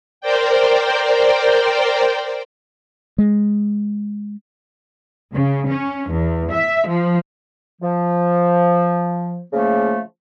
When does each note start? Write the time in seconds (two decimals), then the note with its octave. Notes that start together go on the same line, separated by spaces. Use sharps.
0.21 A#4 C5 D5 G5
3.18 G#3
5.34 C#3
5.68 C#4
6.10 E2
6.52 E5
6.88 F3
7.81 F3
9.52 C#3 F3 A3 A#3